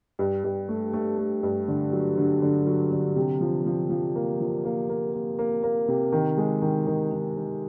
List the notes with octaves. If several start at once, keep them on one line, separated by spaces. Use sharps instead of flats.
G2
G2
A3
A3
A3
G2
D3
F#3
D3
D3
F#3
D3
C3
F3
F3
F3
A#3
F3
A#3
A#3
A#3
A#3
A#3
C3
D#3
G#3
D#3
D#3
D#3
D#3